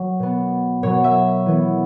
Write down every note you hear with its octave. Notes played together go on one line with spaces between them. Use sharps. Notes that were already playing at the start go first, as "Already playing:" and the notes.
Already playing: F#3 C#4 C#5
B2 B3
B2 F#3 B3 C#5
E5
E3 B3